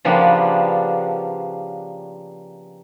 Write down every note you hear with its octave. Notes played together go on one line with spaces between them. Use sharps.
C#3 F3 G3 A#3 B3 D4